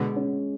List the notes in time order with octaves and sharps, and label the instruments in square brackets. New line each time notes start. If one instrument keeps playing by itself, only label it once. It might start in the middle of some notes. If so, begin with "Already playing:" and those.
Already playing: [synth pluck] B2 D3 [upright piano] G#3
[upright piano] C#4